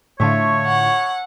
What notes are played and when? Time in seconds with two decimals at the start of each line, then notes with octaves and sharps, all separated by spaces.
0.20 A2 D3 F4 C#5 E5 A5 C#6
0.66 F#5